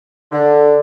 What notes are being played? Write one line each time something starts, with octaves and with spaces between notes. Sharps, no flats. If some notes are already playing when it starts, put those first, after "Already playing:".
D3